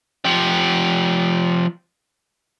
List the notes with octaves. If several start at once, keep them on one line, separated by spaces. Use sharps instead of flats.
F3 G4